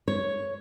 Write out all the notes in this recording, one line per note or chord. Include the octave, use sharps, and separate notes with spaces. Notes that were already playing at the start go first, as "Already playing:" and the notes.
C#5